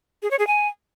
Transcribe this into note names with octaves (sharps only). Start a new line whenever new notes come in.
G#4
C#5
G#4
G#5